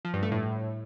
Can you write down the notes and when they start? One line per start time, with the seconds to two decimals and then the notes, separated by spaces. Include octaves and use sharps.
0.05 F3
0.14 G2
0.23 A3
0.32 A2